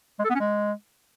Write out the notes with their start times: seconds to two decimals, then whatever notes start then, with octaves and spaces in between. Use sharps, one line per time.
0.19 G#3
0.24 A4
0.30 B3
0.35 C#4
0.40 G#3